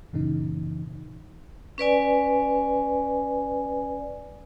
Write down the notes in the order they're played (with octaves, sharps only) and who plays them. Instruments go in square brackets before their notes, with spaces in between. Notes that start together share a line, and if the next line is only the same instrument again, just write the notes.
[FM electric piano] F#2 A#2 C#3 E3 D#4
[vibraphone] C#4 B4 D5 G#5